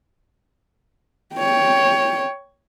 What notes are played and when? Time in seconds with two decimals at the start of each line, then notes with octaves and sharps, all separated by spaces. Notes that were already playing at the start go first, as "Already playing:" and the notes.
1.35 C#5 G5